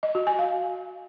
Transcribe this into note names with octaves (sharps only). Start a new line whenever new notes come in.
D#5
F#4
G#5
F5